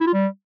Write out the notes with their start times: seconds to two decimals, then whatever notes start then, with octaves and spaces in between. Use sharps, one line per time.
0.01 E4
0.07 F4
0.13 G3